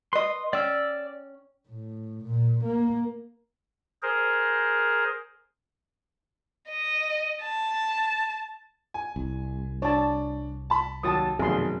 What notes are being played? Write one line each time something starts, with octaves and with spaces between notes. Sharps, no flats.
B4 D#5 C6
C#4 D5 G5 E6
A2
A#2
A#3
G#4 A#4 C5
D#5
A5
G#5
C2
D4 C#5 A5
A5 B5
D#2 F#3 A5 D#6 A6
F1 F#2 B2 D#3 G#4 C6